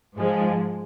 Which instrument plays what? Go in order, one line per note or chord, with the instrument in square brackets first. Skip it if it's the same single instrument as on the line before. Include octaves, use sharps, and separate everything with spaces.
[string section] G#2 F3 G#3